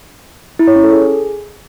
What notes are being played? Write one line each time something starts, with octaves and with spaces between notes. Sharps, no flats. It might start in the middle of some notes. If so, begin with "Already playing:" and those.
E4
C#5
C#4
A4
G#4